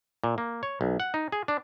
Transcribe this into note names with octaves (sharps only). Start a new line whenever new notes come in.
A#2
A#3
C#5
B1
F#5
D#4
G#4
D4